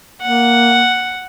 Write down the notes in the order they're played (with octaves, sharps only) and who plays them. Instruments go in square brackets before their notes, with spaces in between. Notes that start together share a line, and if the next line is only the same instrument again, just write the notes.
[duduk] A#3 [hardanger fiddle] F#5